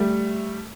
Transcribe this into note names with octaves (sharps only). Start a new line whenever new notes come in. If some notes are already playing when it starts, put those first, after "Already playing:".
Already playing: G3 A3